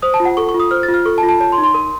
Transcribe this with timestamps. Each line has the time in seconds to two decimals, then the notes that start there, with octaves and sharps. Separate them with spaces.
0.02 C5 D#6
0.14 A5
0.20 F4
0.25 F#5
0.37 A4 C#6
0.49 C#6
0.54 F4
0.60 D#6
0.71 C5 F6
0.83 A6
0.88 F4
0.94 F6
1.05 A4 C#6
1.18 A5
1.23 F4
1.29 A5
1.40 C#5 A5
1.52 C6
1.58 D#4
1.64 C6
1.74 A#4